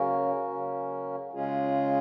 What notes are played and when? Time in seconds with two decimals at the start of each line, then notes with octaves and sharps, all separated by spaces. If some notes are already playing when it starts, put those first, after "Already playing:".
Already playing: C#3 F#3 A#3 C#4 F#4 A#4
0.49 C#3 F#3 A#3 C#4
1.32 C#3 G#3 C#4 F4 G#4